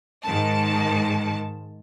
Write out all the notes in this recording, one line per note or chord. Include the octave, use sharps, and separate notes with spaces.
G#2 D#3 A5